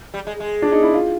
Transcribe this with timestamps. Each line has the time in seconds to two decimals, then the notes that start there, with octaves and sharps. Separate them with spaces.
0.14 G3
0.27 G#3
0.40 G#3
0.62 D4
0.72 D#4
0.83 E4
0.94 F4